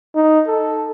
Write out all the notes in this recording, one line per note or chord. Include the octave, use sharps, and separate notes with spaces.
D#4
A4